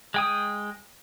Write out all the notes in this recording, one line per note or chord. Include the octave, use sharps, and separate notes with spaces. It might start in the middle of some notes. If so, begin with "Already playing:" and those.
G#3 G5 D#6